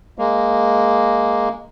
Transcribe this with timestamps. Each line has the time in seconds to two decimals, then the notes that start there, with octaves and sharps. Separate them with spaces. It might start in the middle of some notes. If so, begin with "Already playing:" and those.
0.18 G#3 A#3